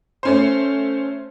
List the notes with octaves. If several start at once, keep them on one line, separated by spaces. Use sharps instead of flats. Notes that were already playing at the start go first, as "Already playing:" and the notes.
A3 C#4 C5